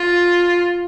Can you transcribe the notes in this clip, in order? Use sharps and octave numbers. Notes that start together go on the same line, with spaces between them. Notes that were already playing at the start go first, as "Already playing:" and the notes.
Already playing: F4